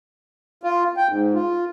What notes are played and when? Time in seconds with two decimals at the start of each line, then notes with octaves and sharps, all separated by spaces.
0.63 F4
0.97 G5
1.09 G#2
1.34 F4